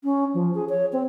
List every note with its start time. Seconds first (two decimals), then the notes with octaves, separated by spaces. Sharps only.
0.04 C#4
0.34 F3
0.55 G#4
0.69 C#5
0.93 C4